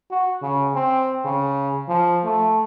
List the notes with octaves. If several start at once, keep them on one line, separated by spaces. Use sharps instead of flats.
F#4
C#3
C4
C#3
F3
A3